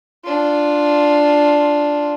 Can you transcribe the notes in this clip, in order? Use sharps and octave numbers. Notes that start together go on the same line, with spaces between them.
D4 F4